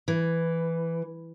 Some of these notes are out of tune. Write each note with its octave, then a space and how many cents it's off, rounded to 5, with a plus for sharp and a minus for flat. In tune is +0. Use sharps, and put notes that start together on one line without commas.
E3 +5